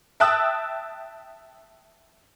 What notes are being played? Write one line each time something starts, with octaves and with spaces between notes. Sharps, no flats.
E5 G5 A5 D#6 E6 F#6